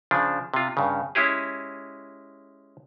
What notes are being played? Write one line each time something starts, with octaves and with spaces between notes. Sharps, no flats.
C#3 F3 D4
C3 F4
G2 C#3
G#3 C#4 E4 G4 G#4